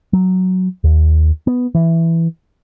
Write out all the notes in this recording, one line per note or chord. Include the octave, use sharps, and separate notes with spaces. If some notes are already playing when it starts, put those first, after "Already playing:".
F#3
D#2
B3
E3